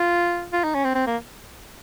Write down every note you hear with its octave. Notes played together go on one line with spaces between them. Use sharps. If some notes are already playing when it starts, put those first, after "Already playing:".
Already playing: F4
F4
D#4
C#4
C4
C4
A#3